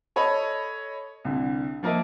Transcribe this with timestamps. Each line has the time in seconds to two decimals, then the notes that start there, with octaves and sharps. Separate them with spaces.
0.16 A4 C#5 D#5 B5
1.25 C2 D3
1.83 F3 A#3 A#4 D#5 E5